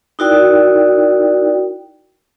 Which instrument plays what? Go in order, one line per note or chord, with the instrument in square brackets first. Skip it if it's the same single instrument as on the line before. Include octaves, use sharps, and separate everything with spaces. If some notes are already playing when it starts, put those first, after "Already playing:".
[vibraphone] D#4 E4 F#4 A#4 D5 G5